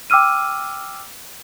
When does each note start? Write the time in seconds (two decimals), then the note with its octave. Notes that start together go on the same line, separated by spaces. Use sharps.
0.10 G5 D6 E6 F6 D#7